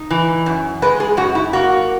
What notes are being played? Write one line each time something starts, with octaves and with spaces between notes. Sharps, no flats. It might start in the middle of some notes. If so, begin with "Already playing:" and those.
Already playing: D#4
E3
F#2
G#3 B4
G#4
F#2 F#4
E4
A#3 F#4